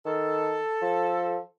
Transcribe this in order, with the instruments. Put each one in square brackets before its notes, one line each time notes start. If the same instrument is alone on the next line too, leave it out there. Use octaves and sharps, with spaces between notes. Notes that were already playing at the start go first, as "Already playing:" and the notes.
[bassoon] D#3 [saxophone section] A4
[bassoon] F3